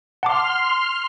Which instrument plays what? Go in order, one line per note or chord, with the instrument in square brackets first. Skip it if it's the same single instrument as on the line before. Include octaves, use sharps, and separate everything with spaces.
[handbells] F#5 A5 D6 [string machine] C6 F6